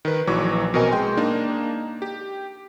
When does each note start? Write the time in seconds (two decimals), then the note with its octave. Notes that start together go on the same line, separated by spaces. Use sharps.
0.05 D#3 B4
0.27 A#1 E3 F#3 C#6 D6
0.74 B2 C4 A#4 D#5 G#5
0.91 G#3 G5 C6
1.17 A#3 D4 D#4
2.02 G4